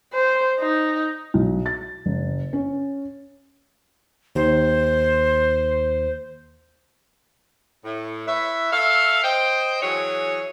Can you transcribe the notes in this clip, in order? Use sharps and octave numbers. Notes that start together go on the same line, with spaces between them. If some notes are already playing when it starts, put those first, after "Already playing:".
C5
D#4
B1
A6
F#1
C#4
D#2 C5
A2
E4 B4 C#5 E5
A4 C#5 E5 F5
C5 D#5 G5
E3 F#3 G#4 C#5